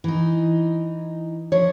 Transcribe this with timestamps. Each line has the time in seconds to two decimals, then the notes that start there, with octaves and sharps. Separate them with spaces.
0.04 E3 D#4
1.52 F3 D4 C#5